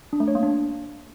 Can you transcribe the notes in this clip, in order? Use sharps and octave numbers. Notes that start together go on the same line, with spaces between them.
D4
A3
C#5
A#3
D4